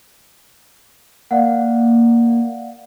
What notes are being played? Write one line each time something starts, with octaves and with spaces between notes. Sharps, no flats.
A#3 D5 F5 F#5